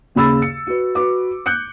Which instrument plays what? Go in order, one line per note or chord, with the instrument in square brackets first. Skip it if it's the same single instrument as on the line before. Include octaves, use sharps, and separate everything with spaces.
[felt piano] D#2 C#3 B5 E6 A6
C#7
F#4 B4
F#4 B4 D6
F#6 G6 C#7